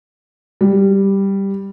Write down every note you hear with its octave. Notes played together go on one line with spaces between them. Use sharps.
G3